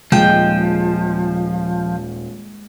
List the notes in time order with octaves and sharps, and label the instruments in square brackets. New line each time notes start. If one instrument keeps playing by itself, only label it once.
[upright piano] D#1 [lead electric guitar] F3 [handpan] G#3 [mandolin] G5